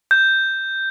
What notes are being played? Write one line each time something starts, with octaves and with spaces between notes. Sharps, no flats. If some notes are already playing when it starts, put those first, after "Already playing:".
G6